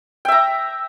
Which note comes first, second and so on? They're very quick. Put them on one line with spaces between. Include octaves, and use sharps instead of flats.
G5 E5 A#5